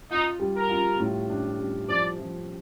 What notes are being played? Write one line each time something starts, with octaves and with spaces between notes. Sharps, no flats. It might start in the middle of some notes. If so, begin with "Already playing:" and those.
D#4 F4
G3
A#4
F4
A2
D4
G3
F3 D5
F3